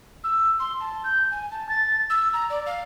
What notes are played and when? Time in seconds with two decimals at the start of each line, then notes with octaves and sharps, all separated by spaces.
0.24 E6
0.60 C6
0.80 A5
1.04 G6
1.31 G#5
1.51 A5
1.69 A6
2.10 E6
2.33 A#5
2.50 D5
2.66 F5